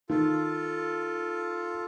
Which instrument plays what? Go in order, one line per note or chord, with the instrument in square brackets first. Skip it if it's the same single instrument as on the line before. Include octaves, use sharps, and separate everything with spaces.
[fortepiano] D#3 [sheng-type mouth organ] F4 A4